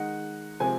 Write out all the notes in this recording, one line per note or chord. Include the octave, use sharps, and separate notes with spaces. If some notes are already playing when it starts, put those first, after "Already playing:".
Already playing: D#3 G#3 D#4 F#5
C3 F3 G#3 C4 G#5